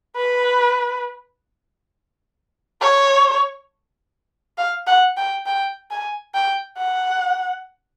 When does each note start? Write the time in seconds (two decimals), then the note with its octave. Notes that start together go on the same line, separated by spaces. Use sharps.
0.17 B4
2.81 C#5
4.58 F5
4.87 F#5
5.17 G5
5.46 G5
5.90 G#5
6.34 G5
6.78 F#5